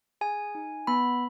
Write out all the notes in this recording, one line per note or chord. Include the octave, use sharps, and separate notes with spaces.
G#4 G#5
D#4
B3 B5